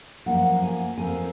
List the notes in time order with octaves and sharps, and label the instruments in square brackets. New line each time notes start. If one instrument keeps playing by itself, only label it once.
[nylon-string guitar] F#2 F3 A#3 D#4 F#5
G#5
F2 F3 A#3 C#4 G#5